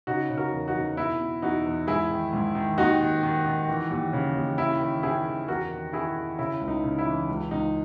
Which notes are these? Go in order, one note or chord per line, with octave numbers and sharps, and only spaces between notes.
C#3 D#4 F#4
C#3
F#4 A#4
E2
D#4 F#4
E2
B2 E4
B2
E2 D#4 F#4
E2
G#2 E4 G#4
D#3
G#2
D#3
D#2 D#4 F#4
D#3
D#3
D#3
E3
D#2
C#3
D#2
D#3 E4
D#3
D#3 E4 G#4
D#3
E2 F#4 A#4
D#3
D#3 E4 G#4
D#3
C#3 E4
C#2
D#4
C#3
E4
E3
C#2
C#2 D#4